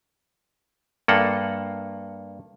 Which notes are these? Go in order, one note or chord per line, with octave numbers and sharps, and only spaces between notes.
G2 A#3 A4 F#5